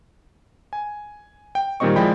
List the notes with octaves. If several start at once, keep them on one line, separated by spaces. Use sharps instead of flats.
G#5
G5
A#2 D#3 G3 C4 D#5 C#6
F3 G#3 E4 D5 G5 B5